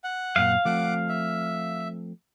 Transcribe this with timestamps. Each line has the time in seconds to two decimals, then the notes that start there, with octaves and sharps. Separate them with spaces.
0.04 F#5
0.36 F#2 A#2 F5
0.65 F3 A3 C4 F#5 D6
1.09 E5